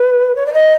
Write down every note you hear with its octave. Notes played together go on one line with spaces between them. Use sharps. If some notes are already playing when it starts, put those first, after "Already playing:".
Already playing: B4
C#5
D5
D#5